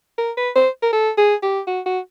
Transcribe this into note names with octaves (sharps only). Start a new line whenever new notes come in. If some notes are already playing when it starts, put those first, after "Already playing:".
A#4
B4
C5
A#4
A4
G#4
G4
F#4
F#4